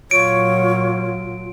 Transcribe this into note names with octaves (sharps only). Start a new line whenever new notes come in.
A#2 F#3 F4 C#5 D7